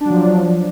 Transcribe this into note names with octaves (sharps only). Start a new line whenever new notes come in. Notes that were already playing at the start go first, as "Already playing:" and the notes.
F3 F#3 D4